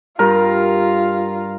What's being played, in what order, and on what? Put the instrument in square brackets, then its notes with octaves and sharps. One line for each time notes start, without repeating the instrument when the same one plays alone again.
[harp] G2 [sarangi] F4 [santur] A#4